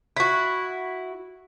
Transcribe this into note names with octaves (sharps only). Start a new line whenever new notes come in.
E4 F#4